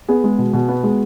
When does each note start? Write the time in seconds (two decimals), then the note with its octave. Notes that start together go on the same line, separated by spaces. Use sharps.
0.09 B3 G#4
0.24 G#3
0.38 B2
0.53 B2
0.68 B3 F#4
0.83 G#3